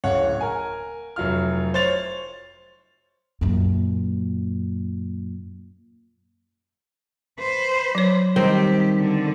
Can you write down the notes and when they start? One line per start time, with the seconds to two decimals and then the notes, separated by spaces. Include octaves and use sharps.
0.04 D1 C#3 C#5 F#5
0.41 A#4 G#5
1.16 F1 F#3 F4 F6
1.74 C5 C#5 A6 F7
3.41 F#2 A#2
7.39 B4 C5
7.95 F#3 C#5
8.36 D#3 G3 C4 G4 C5
8.96 D3